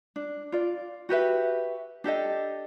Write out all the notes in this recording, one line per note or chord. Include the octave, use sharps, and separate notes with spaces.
D4
F4 D5
F#4 G4 B4 E5
D4 G4 A4 D#5